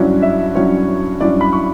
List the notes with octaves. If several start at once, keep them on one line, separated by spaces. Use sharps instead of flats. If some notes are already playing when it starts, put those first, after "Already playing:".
Already playing: G2 F#3 C#4 E4
E5
G2 F#3 C#4 E4 C#5
G2 F#3 C#4 E4 D5
B5
C#6